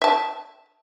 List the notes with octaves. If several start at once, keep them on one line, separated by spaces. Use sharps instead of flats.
E5 A5